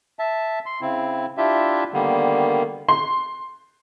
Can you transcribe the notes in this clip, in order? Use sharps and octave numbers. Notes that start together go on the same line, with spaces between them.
E5 A5
C6
C#3 C4 E4
D4 E4 F4 G4 E5
D3 D#3 G3 A#3 B3
C6